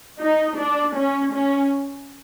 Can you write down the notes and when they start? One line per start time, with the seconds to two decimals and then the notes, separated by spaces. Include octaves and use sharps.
0.21 D#4
0.58 D4
0.96 C#4
1.34 C#4